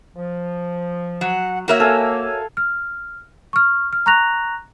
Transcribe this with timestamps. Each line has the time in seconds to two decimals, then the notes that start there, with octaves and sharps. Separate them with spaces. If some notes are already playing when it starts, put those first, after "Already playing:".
0.16 F3
1.21 F#3 F#5
1.68 A#3 F#4 A#4 C#5 E5
1.80 A4 F5 G#5
2.57 F6
3.53 C#6 F6
3.93 F6
4.06 A#5 C#6 F#6 A#6 F7